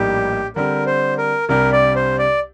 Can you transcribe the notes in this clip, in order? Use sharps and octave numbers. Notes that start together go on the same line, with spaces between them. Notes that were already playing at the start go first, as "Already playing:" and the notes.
Already playing: A#1 A2 G3 A#3 D#4 G4
D3 G3 C4 G4 A#4
C5
A#4
C2 C3 G3 D4 G4 A#4
D5
C5
D5